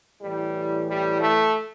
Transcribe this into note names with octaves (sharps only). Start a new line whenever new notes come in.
A2 E3 G3
G3
A3